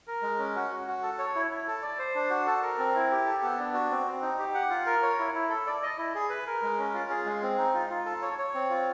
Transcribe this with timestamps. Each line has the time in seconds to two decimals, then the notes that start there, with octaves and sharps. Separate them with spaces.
0.07 A#4
0.22 G#3
0.39 C#4
0.55 F#4
0.70 F#4
0.87 F#4
1.02 A4
1.19 C#5
1.35 E4
1.51 E4
1.67 A4
1.82 D5
1.99 C5
2.15 D4
2.30 F#4
2.46 A4
2.62 A#4
2.78 C4
2.95 E4
3.11 G4
3.26 A4
3.43 B3
3.59 D4
3.74 F#4
3.91 C4
4.06 C4
4.22 D#4
4.39 G4
4.54 F#5
4.70 F4
4.86 A#4
5.02 C#5
5.19 E4
5.34 E4
5.50 A4
5.67 D5
5.83 D#5
5.98 E4
6.15 G#4
6.30 B4
6.47 A#4
6.62 G#3
6.78 C#4
6.94 F4
7.10 G#4
7.26 G#3
7.43 C4
7.58 D#4
7.74 F4
7.90 F4
8.05 A4
8.22 C#5
8.39 C#5
8.54 C4
8.70 F4